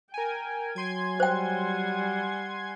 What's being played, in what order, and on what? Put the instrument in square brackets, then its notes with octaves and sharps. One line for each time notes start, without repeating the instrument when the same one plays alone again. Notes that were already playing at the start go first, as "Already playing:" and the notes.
[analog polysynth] A#4 G#5 [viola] G5
[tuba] F#3 [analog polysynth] G#5 C6 G#6
[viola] G3 F#5 [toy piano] C5 G5